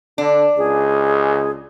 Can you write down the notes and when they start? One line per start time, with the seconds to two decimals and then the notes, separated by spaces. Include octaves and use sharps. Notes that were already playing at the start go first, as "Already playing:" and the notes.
0.18 D3 D4
0.58 C#2 G#4